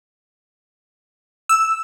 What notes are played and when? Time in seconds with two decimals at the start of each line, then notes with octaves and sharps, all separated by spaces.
1.49 E6